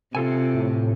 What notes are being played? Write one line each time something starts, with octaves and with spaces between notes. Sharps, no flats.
C3 F4 A4 G#5
A2